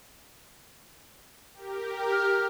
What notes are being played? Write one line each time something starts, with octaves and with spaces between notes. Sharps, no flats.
G4 A#4
F6